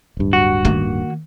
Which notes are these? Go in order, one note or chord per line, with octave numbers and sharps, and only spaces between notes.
D1 G2
F#4
D#3 A#3